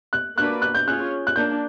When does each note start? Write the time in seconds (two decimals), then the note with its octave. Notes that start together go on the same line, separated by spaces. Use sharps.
0.13 F#6
0.37 A#3 D4 F#4 B4 D5 F#6
0.62 F#6
0.75 G6
0.86 C#4 F4 G#4 C#5 F#6
1.27 F#6
1.36 A#3 D4 G6